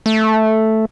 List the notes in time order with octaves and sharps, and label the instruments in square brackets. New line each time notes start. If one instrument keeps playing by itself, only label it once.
[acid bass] A3